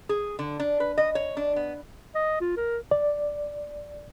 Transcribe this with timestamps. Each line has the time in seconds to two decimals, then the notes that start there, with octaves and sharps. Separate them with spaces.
0.09 G#4
0.39 D3
0.60 D4
0.80 B4
0.98 D#5
1.15 C#5
1.37 D4
1.56 B3
2.15 D#5
2.41 F4
2.57 A#4
2.91 D5